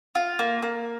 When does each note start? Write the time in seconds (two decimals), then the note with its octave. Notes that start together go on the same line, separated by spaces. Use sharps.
0.15 F4
0.39 A#3
0.62 A#3